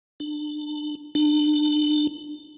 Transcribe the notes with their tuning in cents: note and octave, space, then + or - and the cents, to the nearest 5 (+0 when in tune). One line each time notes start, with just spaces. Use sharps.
D4 +30
D4 +35